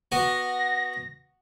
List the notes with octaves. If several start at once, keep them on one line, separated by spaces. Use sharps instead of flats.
B3 F#4 A#6